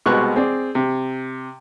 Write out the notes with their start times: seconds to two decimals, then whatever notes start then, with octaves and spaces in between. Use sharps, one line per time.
0.06 C2 B2 G#3 B4 C#6 F#6
0.36 C4 G#4 D5
0.75 C3